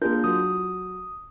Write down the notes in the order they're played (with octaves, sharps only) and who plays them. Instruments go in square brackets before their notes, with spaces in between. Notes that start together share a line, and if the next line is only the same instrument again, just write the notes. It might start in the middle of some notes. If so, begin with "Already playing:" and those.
[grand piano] A#3 G#4 A#4 [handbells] D4 F4 G6
[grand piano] F#3 [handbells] D#6